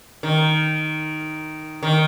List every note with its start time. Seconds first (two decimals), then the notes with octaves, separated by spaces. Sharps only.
0.23 D#3
1.83 D#3